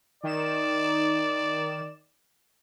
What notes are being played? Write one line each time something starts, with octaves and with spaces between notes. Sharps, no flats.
D#3 D5 E7